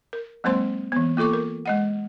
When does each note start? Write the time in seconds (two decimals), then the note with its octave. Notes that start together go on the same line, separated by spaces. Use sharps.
0.13 A#4
0.44 F#3 G#3 A#3 C4 C5 C6
0.92 E3 B3
1.17 A#3 F4 A4 C#6 D6
1.33 A#4
1.66 G#3 D#5 F#5